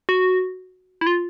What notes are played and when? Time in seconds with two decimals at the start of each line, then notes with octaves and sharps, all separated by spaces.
0.09 F#4
1.01 E4
1.06 F4